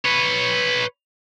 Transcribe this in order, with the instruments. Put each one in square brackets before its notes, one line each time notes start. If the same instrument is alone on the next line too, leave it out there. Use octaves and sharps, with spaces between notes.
[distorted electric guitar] B4 C#5